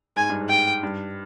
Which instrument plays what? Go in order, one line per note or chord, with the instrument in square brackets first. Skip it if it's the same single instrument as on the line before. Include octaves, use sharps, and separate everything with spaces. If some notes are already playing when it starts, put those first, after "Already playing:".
[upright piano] G#2 [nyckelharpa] G#5
[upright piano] G2
G#2
[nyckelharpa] G5
[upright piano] G2